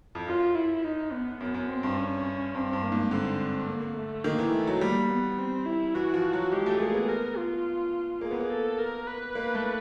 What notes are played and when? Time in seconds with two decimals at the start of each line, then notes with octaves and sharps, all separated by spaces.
0.15 F2
0.27 F#2 F4
0.55 E4
0.84 D#4
1.12 B3
1.40 F#2 B3
1.54 F#2
1.69 C4
1.83 G2
1.97 C#4
2.54 G2 C4
2.73 G2
2.83 A#3
2.92 G#2
3.11 D3 C4
3.68 A#3
3.96 A3
4.24 D#3 A#3
4.38 E3
4.52 A3
4.67 F#3
4.81 G3 A#3
5.09 B3
5.38 C4
5.66 E4
5.95 E3 F#4
6.14 F3
6.33 F#3
6.52 G#3 G4
6.66 A3
6.80 A#3 G#4
6.94 B3
7.08 A#4
7.37 F4
8.21 A#3 G#4
8.31 B3
8.40 A#3
8.51 A4
8.79 A#4
9.07 B4
9.35 A#3
9.55 A3